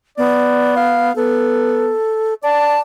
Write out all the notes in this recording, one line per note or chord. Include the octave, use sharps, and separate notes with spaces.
B3 D5
F5
B3 A4
D5 A5